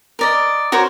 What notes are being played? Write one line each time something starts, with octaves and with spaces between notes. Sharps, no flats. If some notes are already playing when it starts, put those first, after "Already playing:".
A#4 D5 D#5
F#4 A#4 C5 C#5